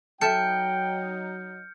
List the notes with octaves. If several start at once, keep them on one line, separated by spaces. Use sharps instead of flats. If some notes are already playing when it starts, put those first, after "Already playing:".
F#3 D#4 A4 E5 G5 F6 G6 C#7